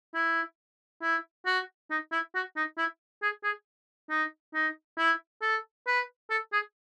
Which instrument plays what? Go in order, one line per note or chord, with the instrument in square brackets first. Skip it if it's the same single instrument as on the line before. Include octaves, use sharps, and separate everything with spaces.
[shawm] E4
E4
F#4
D#4
E4
F#4
D#4
E4
G#4
G#4
D#4
D#4
E4
A4
B4
A4
G#4